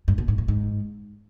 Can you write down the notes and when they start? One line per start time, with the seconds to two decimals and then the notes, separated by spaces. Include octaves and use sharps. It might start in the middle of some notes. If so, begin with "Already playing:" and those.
0.08 G2
0.18 B2
0.28 G#2
0.38 A2
0.48 G#2